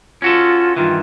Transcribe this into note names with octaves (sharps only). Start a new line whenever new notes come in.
C#4 F4 F#4 A4
G2 D#3 E3 F4